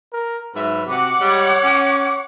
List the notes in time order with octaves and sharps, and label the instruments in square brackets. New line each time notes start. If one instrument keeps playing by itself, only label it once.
[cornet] A#4
[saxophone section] G#2 F#3 E5 [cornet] B4
[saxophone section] C3 [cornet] F#4 [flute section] F#5 D6
[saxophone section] G3 G#3 G4 [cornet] C#5
[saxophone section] C#4